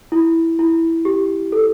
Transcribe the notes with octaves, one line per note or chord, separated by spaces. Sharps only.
E4
E4
G4
A4